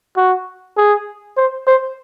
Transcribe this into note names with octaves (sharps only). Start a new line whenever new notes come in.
F#4
G#4
C5
C5